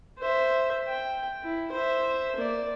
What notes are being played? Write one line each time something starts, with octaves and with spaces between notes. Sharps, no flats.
C5 E5
G5
E4
C5 E5
A#3 D5